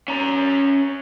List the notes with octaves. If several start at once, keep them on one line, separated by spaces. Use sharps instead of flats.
C#4 A#5